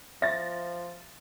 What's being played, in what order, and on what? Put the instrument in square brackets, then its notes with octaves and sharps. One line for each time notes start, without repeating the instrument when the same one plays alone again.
[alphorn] F3 [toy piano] E5 [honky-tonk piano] A6 A#6